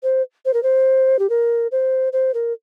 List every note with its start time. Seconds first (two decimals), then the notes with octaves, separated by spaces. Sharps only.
0.03 C5
0.45 C5
0.54 A#4
0.63 C5
1.19 G4
1.30 A#4
1.72 C5
2.13 C5
2.34 A#4